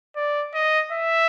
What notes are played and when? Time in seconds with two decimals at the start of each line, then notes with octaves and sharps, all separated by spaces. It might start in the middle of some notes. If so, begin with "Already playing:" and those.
0.16 D5
0.54 D#5
0.92 E5